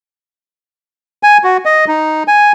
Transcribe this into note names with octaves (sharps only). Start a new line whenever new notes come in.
G#5
F#4
D#5
D#4
G#5